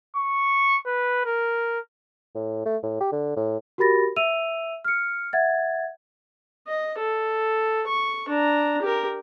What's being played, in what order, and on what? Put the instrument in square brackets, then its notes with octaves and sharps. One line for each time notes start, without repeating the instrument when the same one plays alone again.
[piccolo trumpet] C#6
B4
A#4
[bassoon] A2
A3
A2
G4
D3
A2
[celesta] F#4 G4 A#4 B5 A6 A#6
E5 E6 D#7 F7
F6 C#7
E5 F#5 G#6 A6
[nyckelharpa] D#5
A4
C#6
D4 A#5
G4 A#4